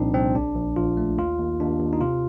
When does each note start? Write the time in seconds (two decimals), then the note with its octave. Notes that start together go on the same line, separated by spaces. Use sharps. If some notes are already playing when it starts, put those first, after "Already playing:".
Already playing: C2 A#2 F3 C4 D4 D#4
0.14 C2 C4
0.35 A#1 D4
0.56 A#1
0.76 A#1 F4
0.97 A3
1.18 D#2 F4
1.39 D#2
1.60 D#2 D4
1.80 D#2
1.93 D#4
2.00 C3 F4